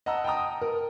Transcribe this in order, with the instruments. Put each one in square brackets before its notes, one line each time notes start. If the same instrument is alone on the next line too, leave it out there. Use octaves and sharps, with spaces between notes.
[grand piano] D#5 F#5 A5 A#5 E6
G5 A5 A#5 D#6
A#4